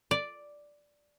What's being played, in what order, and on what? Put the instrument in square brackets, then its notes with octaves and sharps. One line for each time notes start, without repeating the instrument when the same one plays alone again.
[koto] D5